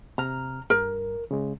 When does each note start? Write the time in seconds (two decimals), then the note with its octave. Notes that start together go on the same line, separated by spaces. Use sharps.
0.18 C3 A#5 F6
0.70 G2 A#4
1.31 C#3 G#3